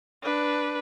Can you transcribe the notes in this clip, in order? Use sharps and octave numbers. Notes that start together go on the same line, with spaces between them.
D4 B4